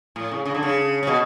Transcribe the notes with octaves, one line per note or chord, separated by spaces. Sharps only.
A2
C#3
C#3
D3
C#3
C#3
B2